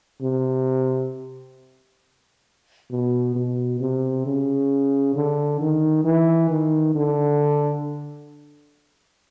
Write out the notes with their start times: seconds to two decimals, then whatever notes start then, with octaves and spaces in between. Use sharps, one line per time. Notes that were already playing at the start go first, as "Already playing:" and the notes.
0.22 C3
2.91 B2
3.35 B2
3.80 C3
4.26 C#3
5.15 D3
5.60 D#3
6.05 E3
6.50 D#3
6.95 D3